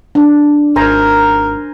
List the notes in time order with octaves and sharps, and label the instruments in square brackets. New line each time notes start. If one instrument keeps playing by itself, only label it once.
[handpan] D4
[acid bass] G#1 [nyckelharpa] A#4 [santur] C5 G#5 A#5